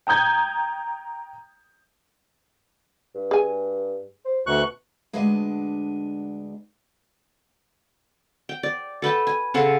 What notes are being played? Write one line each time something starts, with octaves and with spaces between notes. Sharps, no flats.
G5 A#5 D#6 G6 G#6
G2
G#4 G#5
C5
D2 B2 C#6 F#6
D2 G#3 B3 D4 D5 D#5
G5
D5
A4 B4 G5 A5
G#5
C#3 A4 F#5 C6